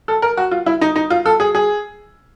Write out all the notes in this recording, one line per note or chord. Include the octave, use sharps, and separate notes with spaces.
A4
A#4
F#4
F4
E4
D#4
D#4
F4
A4
G#4
G#4